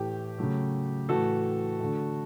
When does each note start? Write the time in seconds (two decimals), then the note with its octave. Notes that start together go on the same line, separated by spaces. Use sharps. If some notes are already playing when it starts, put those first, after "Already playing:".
Already playing: A2 E3 A3 G4
0.38 C#3 F#3 A3
1.09 A2 E3 A3 F#4 A4
1.80 D3 A3